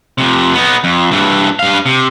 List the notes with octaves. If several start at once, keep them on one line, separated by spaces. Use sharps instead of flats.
F2 C3
B3 D#4
F2
G2 E3
G2 F5
C3